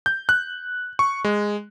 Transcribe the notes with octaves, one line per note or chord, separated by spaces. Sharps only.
G6
F#6
C#6
G#3